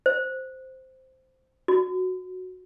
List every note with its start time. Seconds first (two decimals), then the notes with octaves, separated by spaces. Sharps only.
0.06 C5
1.68 F#4